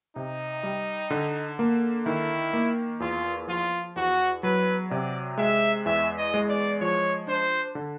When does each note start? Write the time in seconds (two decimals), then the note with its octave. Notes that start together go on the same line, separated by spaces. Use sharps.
0.16 C3 D#4
0.63 G3
1.10 D3
1.59 A#3
2.06 D#3 E4
2.53 A#3
3.00 E2 F4
3.48 F3 F4
3.96 E2 F#4
4.43 F#3 B4
4.90 C3 D5
5.38 G#3 E5
5.86 E2 E5
6.17 D#5
6.34 G#3
6.49 D5
6.80 F3 C#5
7.27 D4 C5
7.75 D3